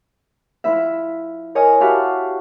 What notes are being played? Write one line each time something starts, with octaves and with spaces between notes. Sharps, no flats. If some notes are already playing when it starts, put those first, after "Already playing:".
F3 E4 E5
A#4 C#5 D#5 G#5
F#4 G4 E5 F5 A5 B5